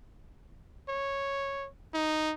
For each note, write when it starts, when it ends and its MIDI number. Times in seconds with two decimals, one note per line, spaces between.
0.89 1.67 73
1.94 2.34 63